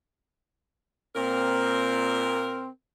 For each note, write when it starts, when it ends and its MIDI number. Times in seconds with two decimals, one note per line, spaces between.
1.16 2.67 46
1.16 2.68 60
1.16 2.67 70